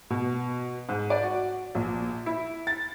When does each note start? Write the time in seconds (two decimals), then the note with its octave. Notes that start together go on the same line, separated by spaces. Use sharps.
0.10 B2
0.89 G#2
1.10 D5
1.23 F#4
1.75 A#1
2.26 E4
2.67 A6